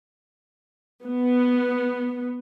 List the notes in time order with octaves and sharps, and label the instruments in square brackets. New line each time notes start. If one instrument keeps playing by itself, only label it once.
[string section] B3